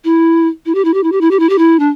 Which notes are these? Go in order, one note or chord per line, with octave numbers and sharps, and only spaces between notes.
E4
E4
G4
E4
G4
E4
G4
E4
G4
E4
G4
E4
D4